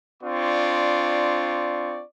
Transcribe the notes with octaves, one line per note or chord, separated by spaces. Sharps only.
C4 D4 F4 D5 C#6